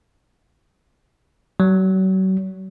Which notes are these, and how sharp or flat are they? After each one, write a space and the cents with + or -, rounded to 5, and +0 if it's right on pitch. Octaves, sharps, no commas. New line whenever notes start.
F#3 +35